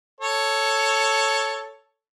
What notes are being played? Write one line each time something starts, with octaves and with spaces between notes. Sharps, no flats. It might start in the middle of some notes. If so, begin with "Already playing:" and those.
A4 C#5